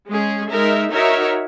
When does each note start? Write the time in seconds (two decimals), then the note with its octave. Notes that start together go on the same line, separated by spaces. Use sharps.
0.09 G#3 C#4 G#4
0.50 G#3 D#4 A#4 E5
0.92 D#4 F#4 A#4 C#5 E5